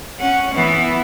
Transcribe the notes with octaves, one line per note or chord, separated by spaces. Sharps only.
C#4 F#5
E3 B3